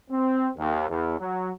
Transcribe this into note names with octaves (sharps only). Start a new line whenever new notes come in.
C4
D#2
E2
F#3